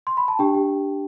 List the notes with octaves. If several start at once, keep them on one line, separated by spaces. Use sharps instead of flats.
C6
B5
A5
D4 G4 G5
G4